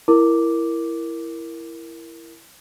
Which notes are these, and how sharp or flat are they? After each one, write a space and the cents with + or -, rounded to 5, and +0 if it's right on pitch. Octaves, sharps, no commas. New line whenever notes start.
E4 +15 A#4 +0 D6 +0